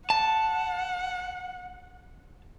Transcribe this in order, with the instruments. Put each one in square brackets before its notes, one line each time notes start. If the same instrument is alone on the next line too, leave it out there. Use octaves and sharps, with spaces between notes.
[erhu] F#5 [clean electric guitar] A5